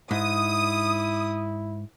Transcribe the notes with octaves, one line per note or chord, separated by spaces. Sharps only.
G#2 E4 D#6